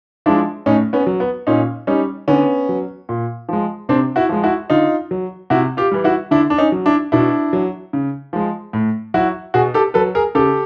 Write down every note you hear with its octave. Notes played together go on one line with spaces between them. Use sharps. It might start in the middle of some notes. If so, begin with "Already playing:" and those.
F3 G#3 D4 E4
A2 C#4 D#4
B3 C#4
F#3
B3
A#2 C#4 D#4
G3 C#4 D#4
D3 B3 C#4
F#3
A#2
F3 G#3
C3 C4 D4
E4 F#4
F3 G#3
E4 F#4
D3 D#4 F4
F#3
C3 E4 F#4
F4 G4
E3 G3
E4 F#4
D3 D4 E4
D4
C#4 D#4
F#3
D4 E4
B2 D4 E4
F#3
C#3
F3 G#3
A2
F#3 E4 F#4
B2 F#4 G#4
G4 A4
F#3 A4 B4
G#4 A#4
C#3 G4 A4